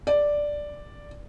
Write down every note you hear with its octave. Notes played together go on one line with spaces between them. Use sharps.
D5